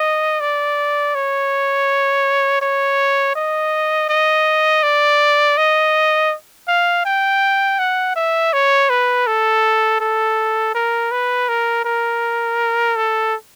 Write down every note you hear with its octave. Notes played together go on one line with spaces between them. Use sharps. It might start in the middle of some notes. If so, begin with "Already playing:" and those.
Already playing: D#5
D5
C#5
C#5
D#5
D#5
D5
D#5
F5
G5
F#5
E5
C#5
B4
A4
A4
A#4
B4
A#4
A#4
A4